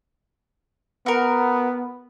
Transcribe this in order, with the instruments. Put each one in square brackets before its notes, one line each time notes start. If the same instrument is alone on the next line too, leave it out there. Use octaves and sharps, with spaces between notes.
[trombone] B3 [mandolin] F#4 A#4